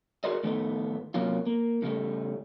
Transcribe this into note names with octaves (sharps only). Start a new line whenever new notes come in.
F#4 G#4 A#4 C5 D5 D#5
A2 D#3 A3 B3 D#4
C3 F#3 A#3 C#4 F4
A#3
A2 C#3 G3 A3